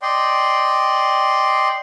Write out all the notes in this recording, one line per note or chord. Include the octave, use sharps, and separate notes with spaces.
D5 D#5 G5 C6